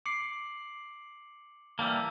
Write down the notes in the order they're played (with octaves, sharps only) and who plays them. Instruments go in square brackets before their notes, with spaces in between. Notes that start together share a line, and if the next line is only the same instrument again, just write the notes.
[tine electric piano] D6 C7 [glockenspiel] C#7 F#7
[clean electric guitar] E3 G3 A#3 [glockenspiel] A5 E6